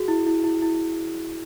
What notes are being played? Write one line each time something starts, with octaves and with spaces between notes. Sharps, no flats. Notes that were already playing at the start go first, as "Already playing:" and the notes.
Already playing: F#4 G#4
E4
E4
E4
E4